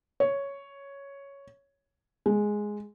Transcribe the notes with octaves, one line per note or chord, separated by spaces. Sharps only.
C#5
G#3